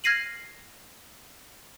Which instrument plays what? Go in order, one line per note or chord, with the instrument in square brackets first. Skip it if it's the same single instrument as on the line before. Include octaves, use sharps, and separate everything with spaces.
[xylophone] F6 G#6 A#6 C7 D#7 F#7